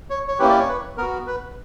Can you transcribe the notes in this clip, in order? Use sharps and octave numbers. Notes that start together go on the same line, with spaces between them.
C#5
C#5
A#3 C#4 E4 G4 B4
D5
C#5
B4
B3 F#4 A#4
B4